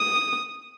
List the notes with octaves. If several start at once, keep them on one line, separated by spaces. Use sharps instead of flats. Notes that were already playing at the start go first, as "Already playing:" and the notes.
Already playing: D#6